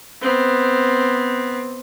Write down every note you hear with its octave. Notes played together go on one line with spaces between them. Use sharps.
B3 C4